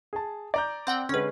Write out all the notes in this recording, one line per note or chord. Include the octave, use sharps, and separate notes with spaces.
G#4 A5
D5 A#5 G6
C4 F#5 G5
D3 G#3 C#4 B4